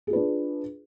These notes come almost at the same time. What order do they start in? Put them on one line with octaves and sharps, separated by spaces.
G#4 F4 B4 D4